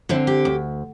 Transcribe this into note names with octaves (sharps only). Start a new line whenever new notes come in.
D3 C4 E4
G4
D2